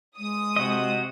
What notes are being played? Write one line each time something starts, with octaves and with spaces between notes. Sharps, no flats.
G#3 D#6
C3 F#4 D#5